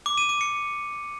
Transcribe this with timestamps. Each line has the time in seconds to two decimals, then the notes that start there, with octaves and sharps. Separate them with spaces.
0.06 D6
0.18 D#7
0.29 D6
0.41 C#7